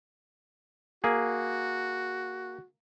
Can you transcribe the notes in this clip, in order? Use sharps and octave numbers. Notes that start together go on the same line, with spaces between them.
A#3 F#4 G#4